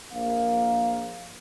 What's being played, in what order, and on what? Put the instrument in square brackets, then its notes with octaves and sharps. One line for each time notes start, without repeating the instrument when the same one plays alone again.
[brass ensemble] A#1 A#3 F5